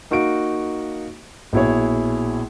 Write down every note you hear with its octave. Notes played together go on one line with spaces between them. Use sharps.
A#3 D#4 F#4 F5 C#6 D7
A#1 B2 E4 G#4 C#5